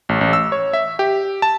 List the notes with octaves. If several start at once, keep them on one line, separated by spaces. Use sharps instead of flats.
A1
A1
E6
C#5
E5
G4
A5